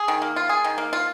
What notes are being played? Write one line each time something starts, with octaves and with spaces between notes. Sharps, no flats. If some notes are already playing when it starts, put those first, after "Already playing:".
Already playing: G#4
D#3
A#3
F4
G#4
D#3
A#3
F4